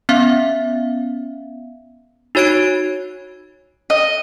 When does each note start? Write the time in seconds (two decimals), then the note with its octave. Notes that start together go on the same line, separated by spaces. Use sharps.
0.09 B3 C#4 E5 F5
2.35 D#4 F#4 C#5 G#6 D7
3.90 D#5